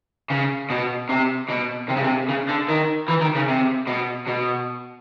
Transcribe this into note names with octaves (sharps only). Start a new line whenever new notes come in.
C#3
B2
C3
B2
C3
C#3
C3
C#3
D3
D#3
E3
D#3
C#3
C3
B2
B2